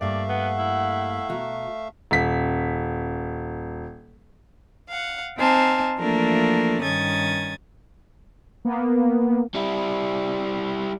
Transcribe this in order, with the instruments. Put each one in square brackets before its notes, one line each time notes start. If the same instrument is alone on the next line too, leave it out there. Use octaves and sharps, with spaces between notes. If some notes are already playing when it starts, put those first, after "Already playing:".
[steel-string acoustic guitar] G2 A#3 [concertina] A3 E5 F5 [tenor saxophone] D5
[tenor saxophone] B3 [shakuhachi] F#5
[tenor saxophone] E4
[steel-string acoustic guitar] B2 F#4 A#5
[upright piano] D#1 B6
[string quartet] F5 F#5
C4 D#4 C5 F5 G#5 A5
E3 F3 A3 A#3 D4 A#4
G2 D#3 C#4 D#6 G#6 A6
[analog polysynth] A#3 B3
[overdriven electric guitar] G3 E4